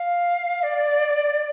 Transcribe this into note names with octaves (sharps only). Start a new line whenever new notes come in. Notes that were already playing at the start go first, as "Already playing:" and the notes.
Already playing: F5
D5